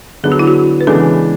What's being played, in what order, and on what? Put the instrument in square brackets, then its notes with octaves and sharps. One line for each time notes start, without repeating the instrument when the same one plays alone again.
[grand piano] D3 F#3 B3 D4 [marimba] G#4
[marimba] F#4
E4
F#4
B4
[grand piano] C#3 E3 G#3 B3 D4 [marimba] A4